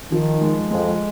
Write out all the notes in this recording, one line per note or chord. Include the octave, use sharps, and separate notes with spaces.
D#3 F3
G#3
F2 G#3